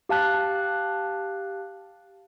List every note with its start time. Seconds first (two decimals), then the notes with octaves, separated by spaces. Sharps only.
0.09 G4 F5 A5 F#6